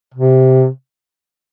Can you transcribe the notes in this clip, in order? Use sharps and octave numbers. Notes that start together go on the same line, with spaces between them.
C3